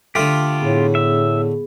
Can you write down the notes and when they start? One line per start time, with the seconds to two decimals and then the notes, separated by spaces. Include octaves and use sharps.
0.15 D3 A3 F4 G4
0.62 A2 B3 G#4
0.95 E5